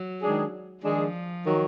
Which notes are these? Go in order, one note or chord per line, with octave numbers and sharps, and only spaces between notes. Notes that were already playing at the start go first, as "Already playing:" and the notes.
Already playing: F#3
D#3 G#3 D4 G#4
D#3 F3 G#3 D4 G#4
D#3 F#3